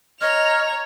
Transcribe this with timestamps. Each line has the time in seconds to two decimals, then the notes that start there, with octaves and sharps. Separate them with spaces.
0.21 C#5 D#5 A#5 F6 F7